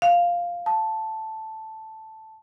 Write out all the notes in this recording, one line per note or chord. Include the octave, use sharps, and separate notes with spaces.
F5
A5